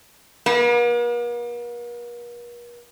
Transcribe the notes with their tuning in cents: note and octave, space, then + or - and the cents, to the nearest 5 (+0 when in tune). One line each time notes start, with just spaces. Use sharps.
A#3 +45